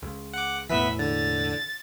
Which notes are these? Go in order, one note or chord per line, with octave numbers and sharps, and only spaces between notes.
C#2
F#5 D6
E1 A2 E3 B3 B4 E5 B6
D3 A6